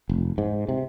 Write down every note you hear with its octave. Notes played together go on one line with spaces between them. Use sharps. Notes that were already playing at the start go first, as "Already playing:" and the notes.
F1
G#2
C3